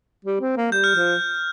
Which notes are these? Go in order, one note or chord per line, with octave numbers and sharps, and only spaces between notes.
G3
C4
A#3
G3 G6
F6
F3